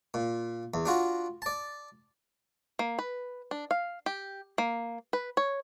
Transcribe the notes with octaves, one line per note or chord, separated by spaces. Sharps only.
A#2
E2
D4 F4 F#4
D5 A5
A#3
B4
D4
F5
G4
A#3
B4
C#5